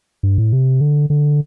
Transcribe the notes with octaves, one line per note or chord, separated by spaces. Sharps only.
G2
A2
C3
D3
D3